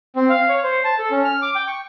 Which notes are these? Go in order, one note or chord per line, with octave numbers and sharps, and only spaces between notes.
C4
F5
C#5
C5
A5
A4
C#4
F6
D6
G5
C#6